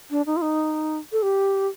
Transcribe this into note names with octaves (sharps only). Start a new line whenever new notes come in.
D4
D#4
F4
D#4
A4
G4